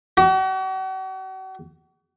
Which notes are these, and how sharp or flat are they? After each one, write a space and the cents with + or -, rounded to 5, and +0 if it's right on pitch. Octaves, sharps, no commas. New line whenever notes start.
F#4 +40